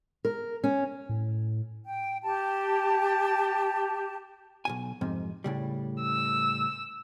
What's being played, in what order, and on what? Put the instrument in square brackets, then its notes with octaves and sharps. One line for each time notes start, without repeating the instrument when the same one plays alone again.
[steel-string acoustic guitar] A#4
C#4
[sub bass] A2
[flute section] G5
G4 A5
[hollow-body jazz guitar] B1 G2 G#5
F2 G#2 C3
A2 C#3 G3
[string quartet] E6